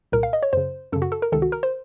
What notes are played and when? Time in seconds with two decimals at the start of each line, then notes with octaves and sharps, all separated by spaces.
0.12 C2 A#2 A#4
0.23 F5
0.33 D#5
0.43 C#5
0.53 F#2 C#3 C5
0.92 F#2 C#3 A4
1.02 F#4
1.12 A4
1.22 A#4
1.32 C#2 C3 D#3 A4
1.42 F#4
1.52 A#4
1.63 C5